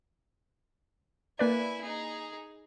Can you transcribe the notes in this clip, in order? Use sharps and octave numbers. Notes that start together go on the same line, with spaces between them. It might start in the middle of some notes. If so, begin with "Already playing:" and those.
A#3 E4 B4 D5 G#5
D#4 G#4